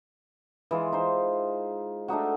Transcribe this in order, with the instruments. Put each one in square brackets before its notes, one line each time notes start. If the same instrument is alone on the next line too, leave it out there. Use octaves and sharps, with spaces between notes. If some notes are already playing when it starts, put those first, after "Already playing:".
[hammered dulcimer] E3 G#3 F4
D#4 C5
A3 D4 D#4 F#4